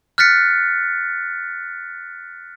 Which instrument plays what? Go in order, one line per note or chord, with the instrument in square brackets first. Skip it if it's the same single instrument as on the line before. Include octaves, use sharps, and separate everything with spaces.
[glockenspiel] F6 F#6 A6 B6 C#7